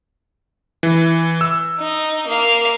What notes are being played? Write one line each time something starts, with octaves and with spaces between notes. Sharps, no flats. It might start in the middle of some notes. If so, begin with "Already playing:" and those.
E3
E6
D#4
A#3 F5